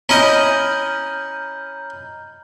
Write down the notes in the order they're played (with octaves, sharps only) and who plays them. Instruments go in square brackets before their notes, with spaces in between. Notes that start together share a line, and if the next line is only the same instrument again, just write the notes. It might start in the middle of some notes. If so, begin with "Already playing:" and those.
[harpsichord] C#4 E4 D#5 [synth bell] A#5 F6 G6